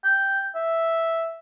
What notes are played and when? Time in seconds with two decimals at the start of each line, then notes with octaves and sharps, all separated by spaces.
0.04 G5
0.55 E5